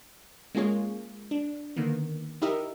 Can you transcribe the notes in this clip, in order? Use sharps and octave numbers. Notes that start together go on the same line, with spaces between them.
G#3 A#3 C#4 F4 G#4 C#5
D4
D3 D#3 A#3 B3
D#4 E4 G4 A#4 D#5 E5